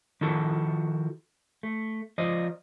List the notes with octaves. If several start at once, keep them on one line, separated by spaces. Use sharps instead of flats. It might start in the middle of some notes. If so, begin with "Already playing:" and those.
D#3 F3 E4 F#4 A4
A3
F3 C5 D5 D#5